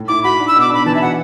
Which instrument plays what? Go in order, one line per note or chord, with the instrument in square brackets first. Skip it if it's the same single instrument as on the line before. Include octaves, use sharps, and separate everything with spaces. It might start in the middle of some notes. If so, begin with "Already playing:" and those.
Already playing: [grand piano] A2
[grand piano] E4 [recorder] D6
[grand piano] F#4 [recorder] B5
[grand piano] D4
[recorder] E6
[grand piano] B2
[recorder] D6
[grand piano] D4 [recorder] B5
[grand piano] E3 [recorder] A5
[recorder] E5
[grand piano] F#4 [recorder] F#5